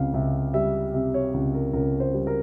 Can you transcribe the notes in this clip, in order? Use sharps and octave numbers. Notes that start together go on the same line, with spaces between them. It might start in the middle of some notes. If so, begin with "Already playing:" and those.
Already playing: C#2 C3 F5
C#2 E5
G3 E5
C3 E5
C#5
C#2
A#4
C#2 A#4
C5
G3
A#4